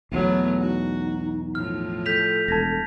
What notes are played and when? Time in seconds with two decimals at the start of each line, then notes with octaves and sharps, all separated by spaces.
0.12 B1 E2 F#3 A3 B3
0.60 D#4 F#4
1.55 A2 F3 F6
2.06 A4 G6 B6 F7
2.48 E1 A5 G#6 A#6